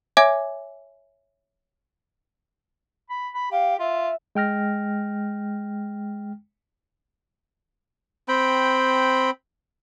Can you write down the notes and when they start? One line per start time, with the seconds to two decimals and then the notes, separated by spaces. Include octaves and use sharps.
0.17 C#5 E5 G#5 D6 G#6
3.10 B5
3.34 B5
3.51 G4 F5
3.79 F4 E5
4.35 G#3 G5 F6 A#6
8.28 C4 G5 B5